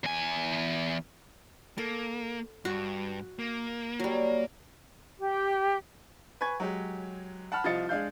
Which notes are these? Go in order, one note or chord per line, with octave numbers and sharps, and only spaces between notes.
E2 G#5
A#3 A4
G2 F#4
A#3
F#3 G3
G4
B4 G#5 C#6 G#6
F#3 G#3 G4
F#5 A5 B5 F6
C2 F3 F4 D#5 A6 C#7
G#3 D4 F5 G6